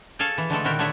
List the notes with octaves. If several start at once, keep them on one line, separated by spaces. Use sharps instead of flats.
G#4 A4 C#5 F5 G#5
E3
D3 G#3 A3 A4
A#2 D#3 E4 F#4 A#4 G5
D3 A3 G#4 C#5 E5 F#5